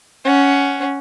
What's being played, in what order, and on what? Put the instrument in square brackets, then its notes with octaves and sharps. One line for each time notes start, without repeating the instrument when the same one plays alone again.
[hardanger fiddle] C#4 F#5